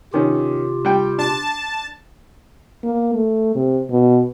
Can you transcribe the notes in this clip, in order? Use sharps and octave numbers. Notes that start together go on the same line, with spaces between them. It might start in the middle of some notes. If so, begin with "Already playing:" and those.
C3 D#3 C#4 F4 G4
G3 G5
D4 A5
A#3
A3
C3
B2